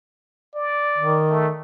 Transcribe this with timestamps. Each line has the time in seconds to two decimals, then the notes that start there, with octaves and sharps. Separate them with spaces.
0.55 D5
0.98 D#3
1.30 A3